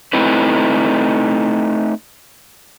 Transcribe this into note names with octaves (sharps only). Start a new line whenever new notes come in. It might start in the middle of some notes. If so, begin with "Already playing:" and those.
A3 C4 D#4 E4 B4